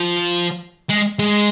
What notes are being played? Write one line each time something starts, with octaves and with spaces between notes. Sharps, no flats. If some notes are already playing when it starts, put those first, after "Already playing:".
Already playing: F3
G#3
G#3